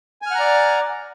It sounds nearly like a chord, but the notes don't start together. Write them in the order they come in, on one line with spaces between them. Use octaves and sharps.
G#5 F6 F#5 A#5 D5